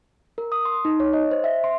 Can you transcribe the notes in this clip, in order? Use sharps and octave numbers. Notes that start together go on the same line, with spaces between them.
A#4
D#6
C6
D#4
C#5
D#5
C5
E5
C6